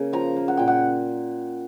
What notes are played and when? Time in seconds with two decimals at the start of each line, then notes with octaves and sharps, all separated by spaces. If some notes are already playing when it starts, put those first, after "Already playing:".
Already playing: C#3 A#3
0.13 F3 A#5
0.36 A#3
0.48 F#5
0.57 A#2 G5
0.68 F#5